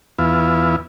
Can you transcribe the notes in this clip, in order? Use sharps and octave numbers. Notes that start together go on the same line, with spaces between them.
E2 B3 E4 F4